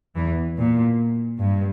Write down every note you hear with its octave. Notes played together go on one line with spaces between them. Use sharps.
E2 E3
A#2
G2